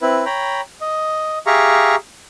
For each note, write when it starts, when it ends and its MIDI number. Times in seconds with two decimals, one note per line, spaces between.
0.02 0.24 60
0.02 0.24 64
0.02 0.24 71
0.25 0.61 73
0.25 0.61 79
0.25 0.61 82
0.25 0.61 83
0.81 1.38 75
1.46 1.96 67
1.46 1.96 68
1.46 1.96 76
1.46 1.96 77
1.46 1.96 82
1.46 1.96 85